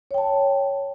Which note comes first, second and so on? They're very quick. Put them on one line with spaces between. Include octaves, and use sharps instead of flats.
C#5 G5 A5